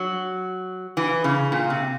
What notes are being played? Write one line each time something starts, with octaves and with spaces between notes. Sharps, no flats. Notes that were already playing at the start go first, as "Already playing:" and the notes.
Already playing: F#3
E3
C#3
A#2
C3